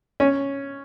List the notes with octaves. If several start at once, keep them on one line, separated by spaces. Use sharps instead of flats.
C#4